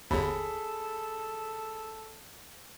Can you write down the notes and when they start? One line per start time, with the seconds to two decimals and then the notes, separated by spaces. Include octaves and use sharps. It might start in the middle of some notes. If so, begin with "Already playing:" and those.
0.11 G1 D#2 G#4 A4 B5